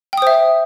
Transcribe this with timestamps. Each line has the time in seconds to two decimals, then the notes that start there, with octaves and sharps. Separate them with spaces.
0.13 G5
0.18 D#6
0.22 C5
0.27 E5